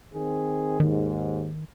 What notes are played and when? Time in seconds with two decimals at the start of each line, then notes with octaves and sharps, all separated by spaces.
0.13 D#3 C4 G#4
0.80 D#2 G#2 D#3